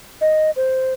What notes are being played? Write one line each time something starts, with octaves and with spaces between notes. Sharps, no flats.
D#5
C5